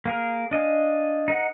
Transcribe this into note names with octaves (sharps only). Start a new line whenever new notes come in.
A#3 G#4 A#4
D4 D#5 F5 G#5
D#4 A#4 F#5